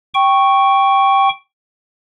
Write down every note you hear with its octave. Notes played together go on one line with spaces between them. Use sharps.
G5 C#6